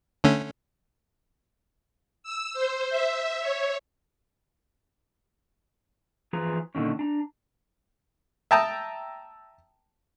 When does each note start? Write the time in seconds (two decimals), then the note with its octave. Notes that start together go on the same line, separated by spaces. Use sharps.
0.24 D3 A3 C#4
2.23 E6
2.53 C5
2.89 E5
3.40 C#5
6.33 E3 F3 F4 G#4 B4 A#5
6.75 A#2 D3 D#3 C#4
6.99 D4 A#5
8.51 E5 G5 A5 A#5 D#6